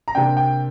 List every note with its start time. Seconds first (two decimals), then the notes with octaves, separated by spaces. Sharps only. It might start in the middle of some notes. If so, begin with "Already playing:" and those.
0.08 A#5
0.15 C3 A#3 D4 G5
0.37 G5